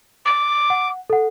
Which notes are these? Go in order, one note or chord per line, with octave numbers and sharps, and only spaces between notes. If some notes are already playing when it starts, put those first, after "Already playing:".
D6
F#5
A4 F#5